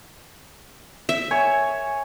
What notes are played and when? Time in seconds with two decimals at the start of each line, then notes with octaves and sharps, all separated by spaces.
1.09 E5
1.31 C#5 G#5